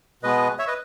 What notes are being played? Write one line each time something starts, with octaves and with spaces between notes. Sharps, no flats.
B2 G#3 B3 B4 D#5
C#5 E5
B4 D#5